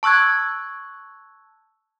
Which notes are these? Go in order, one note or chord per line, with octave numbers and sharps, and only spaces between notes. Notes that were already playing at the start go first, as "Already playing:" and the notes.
A5 C#6 E6 F#6 G#6